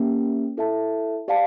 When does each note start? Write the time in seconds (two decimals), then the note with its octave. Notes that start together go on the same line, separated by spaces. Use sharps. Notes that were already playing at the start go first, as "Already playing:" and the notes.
Already playing: A#3 C#4 G4
0.57 E4 A4 E5 A5
1.28 G4 D5 F5 A5